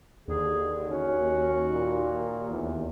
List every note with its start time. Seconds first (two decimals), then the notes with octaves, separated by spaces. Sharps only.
0.28 D#2 D3 G#4
0.90 C#4 F#4
1.72 A#2
2.51 E2